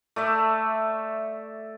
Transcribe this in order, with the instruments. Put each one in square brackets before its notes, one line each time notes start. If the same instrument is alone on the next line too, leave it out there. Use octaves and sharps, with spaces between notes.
[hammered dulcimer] A3 D5 E5